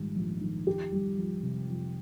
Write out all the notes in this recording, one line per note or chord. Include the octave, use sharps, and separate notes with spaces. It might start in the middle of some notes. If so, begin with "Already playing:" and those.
Already playing: A#1 G#2 D#3 G3
A#1
D#3
F2 G4
G3
F2
C3
F2